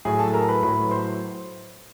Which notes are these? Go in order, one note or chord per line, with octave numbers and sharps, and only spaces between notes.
A2 F#3 G#4 G#5
A4 A5
A#4 A#5
B4 B5
A2 F#3 B4 B5
C5 C6